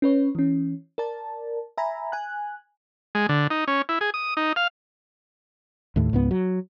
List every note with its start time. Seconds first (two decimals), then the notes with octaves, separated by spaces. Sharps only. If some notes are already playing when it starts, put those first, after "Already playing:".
0.02 C#4 B4 C#5
0.35 E3 C#4
0.98 A#4 D5 A5
1.78 E5 G#5 A#5 B5
2.12 G#5 F#6
3.15 G#3
3.29 D3
3.50 D#4
3.68 C#4
3.89 E4
4.01 G#4
4.14 D#6
4.37 D#4
4.56 F5
5.96 D#2 A2
6.13 C#2 G#2 B3
6.31 F#3